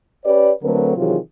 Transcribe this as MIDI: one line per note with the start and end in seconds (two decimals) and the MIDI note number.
0.25 0.51 61
0.25 0.51 67
0.25 0.51 71
0.25 0.51 73
0.25 0.51 74
0.62 0.93 50
0.62 0.93 54
0.62 0.93 57
0.62 0.93 60
0.62 0.93 70
0.62 0.93 71
0.97 1.17 48
0.97 1.17 51
0.97 1.17 52
0.97 1.17 54
0.97 1.17 65
0.97 1.17 68